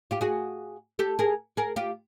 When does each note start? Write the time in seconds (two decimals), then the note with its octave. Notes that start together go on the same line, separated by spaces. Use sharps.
0.11 F4 G4
0.21 F#4 G#4
0.99 G4 A4
1.19 G#4 A#4
1.57 G#4 A#4
1.76 F4 G4